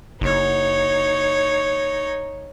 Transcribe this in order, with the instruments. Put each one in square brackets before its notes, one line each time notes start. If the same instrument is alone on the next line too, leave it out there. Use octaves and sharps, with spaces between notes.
[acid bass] F#1 [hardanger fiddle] D#4 C#5